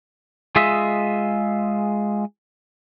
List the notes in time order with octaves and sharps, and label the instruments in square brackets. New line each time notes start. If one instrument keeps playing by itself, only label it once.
[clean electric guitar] G#3 F4 G#4 D#5 E5